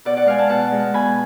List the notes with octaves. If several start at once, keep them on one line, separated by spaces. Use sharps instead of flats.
B2 D5 F#5
D5 F#5
G#3 F5 G#5
F#5 A5
B2 F#5 A5
G#3
B2 G#5 B5